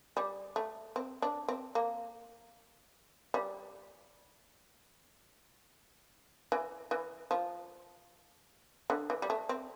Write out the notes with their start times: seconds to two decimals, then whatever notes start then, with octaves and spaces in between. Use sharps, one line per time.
0.17 G3
0.56 A3
0.96 C4
1.22 D4
1.48 C4
1.75 A#3
3.34 G3
6.52 E3
6.91 E3
7.31 F3
8.90 D3
9.10 E3
9.22 G3
9.30 A3
9.49 C4